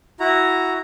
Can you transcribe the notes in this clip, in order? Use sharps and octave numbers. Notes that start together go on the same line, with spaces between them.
E4 F#4 A#5